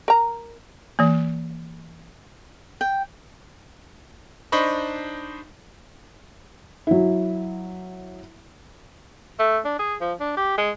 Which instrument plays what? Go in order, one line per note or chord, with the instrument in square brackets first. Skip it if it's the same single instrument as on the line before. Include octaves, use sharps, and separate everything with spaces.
[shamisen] A#4 A#5
[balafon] E3 A#3
[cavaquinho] G5
[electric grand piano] D4 D#4 C5 D#5 B5 C#6
[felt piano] F#3 E4
[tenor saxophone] A3
D4
G#4
F3
D4
G4
G#3